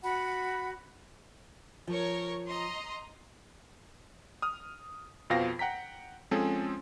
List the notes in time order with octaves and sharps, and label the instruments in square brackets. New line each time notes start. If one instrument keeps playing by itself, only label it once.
[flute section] F#4 F#5 B5
[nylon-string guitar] F3 [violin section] A#4 C#5 C#6
[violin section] D#5 A#5 C6
[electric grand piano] D#6 F6
F2 B2 F3 F5 G5 A#6
F#5 G5 A#5 B6
F3 G#3 C4 C#4 G#4 A4